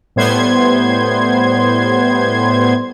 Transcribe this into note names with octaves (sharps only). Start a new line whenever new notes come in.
A2 G3 B3 C5 C6 G#6